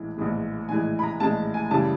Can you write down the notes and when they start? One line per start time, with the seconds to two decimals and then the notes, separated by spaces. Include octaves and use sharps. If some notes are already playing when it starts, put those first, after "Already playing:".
Already playing: A#1 A2 E3 G#3
0.18 A#1 A2 E3 G#3
0.69 A#1 A2 E3 G#3 G#5
0.99 B5
1.03 A#5
1.20 A#1 A2 E3 G#3 A5
1.54 G#5
1.71 F#2 C#3 E3 G3 A5